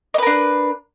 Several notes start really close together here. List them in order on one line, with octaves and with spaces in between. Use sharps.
D#5 B4 A#4 D4